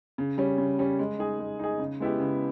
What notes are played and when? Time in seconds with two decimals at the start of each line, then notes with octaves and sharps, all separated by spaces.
0.18 C#3
0.38 G3 C#4
0.58 C#3
0.79 G3 C#4
0.99 G#3
1.19 D#4 G#4
1.39 G#3
1.59 D#4 G#4
1.79 C#3
2.00 G#3 B3 E4 G4
2.20 C#3